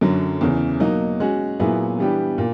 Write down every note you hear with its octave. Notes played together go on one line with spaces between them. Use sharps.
F#2 D3 F#3
E2 C#3 E3
B2 F#3 A#3 D#4
G#3 C#4 F#4
A#2 F#3 B3 E4 G#4
E3 G3 B3 D4 G4
A#2